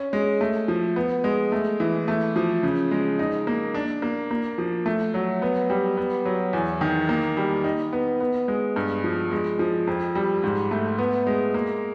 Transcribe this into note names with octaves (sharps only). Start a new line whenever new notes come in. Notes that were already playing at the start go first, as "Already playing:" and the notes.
Already playing: C#4
G#3
A3
F3
B3
G#3
A3
E3
A3
F3
C#3
G#3
D#4
A#3
D4
A#3
A#3
F3
A3
F#3
B3
G3
B3
F#3
E2
D#3
A#3
G3
D#4
B3
B3
G#3
G2
F3
G#3
F3
F2
G3
G#2
A3
B3
G#3
A#3